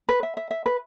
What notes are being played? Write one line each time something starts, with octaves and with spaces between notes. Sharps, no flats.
B4
E5
E5
E5
B4